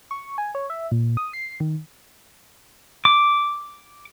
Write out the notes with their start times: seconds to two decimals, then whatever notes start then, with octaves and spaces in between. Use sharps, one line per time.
0.11 C#6
0.38 G#5
0.55 C#5
0.70 E5
0.91 A#2
1.17 D#6
1.33 C7
1.60 D#3
3.05 D6